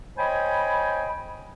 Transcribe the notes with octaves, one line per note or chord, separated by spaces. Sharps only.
C5 C#5 D#5 G5 G#5 B5